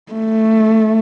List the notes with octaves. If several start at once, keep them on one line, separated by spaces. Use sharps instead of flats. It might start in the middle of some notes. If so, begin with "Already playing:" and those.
A3